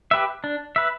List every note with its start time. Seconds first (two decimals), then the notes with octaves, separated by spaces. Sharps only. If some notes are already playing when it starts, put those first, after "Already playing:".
0.11 G4 B4 E5
0.44 D4
0.76 B4 E5